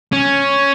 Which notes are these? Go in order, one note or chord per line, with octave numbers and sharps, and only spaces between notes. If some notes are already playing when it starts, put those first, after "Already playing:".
C#4